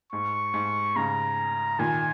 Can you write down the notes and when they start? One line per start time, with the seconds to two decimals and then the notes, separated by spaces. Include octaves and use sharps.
0.12 G#2 C#6
0.54 G#2
0.96 G#2 C#3 A#5
1.79 A#2 D#3 G#5